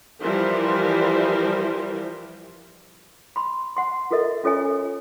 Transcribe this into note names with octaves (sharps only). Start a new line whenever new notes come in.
E3 F3 G3 A#4 C5
B5 C6
F#5 C6
F4 F#4 A4 A#4 D#5 E5
C#4 F4 A4 C#5 D#5 G#5
A4